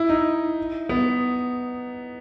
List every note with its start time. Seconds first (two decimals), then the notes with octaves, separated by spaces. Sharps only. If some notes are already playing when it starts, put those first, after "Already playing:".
Already playing: E4
0.09 D#4
0.89 B3